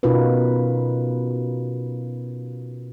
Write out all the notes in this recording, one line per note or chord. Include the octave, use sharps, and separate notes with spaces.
B2 C#4 D#4 F4 A#4 B4